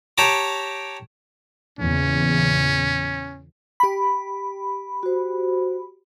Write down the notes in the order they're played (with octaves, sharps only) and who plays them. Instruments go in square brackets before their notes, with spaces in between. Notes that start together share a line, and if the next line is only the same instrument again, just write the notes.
[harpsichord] G4 C#5 A5 A#5 D6
[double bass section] E2 A#2 C#3 [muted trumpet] C#4
[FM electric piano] G4 B5
[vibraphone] F#4 C5